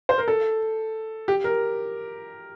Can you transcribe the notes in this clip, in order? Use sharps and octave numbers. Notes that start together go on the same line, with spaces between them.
C5
A#4
A4
G4
A#4